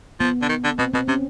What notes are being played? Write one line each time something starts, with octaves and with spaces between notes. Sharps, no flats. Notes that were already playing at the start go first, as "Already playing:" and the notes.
F3 B3
D3
D#3
D3
B2 C4
B2 C4
C3 C#4